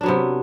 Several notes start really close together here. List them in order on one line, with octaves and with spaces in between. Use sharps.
D4 F#3 B3 C3